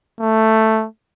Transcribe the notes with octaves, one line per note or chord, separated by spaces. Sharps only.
A3